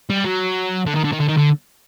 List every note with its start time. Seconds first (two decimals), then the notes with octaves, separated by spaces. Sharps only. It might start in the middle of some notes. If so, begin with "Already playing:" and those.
0.10 G3
0.24 F#3
0.87 D3
0.96 D#3
1.04 D3
1.12 D#3
1.20 D3
1.28 D#3
1.37 D3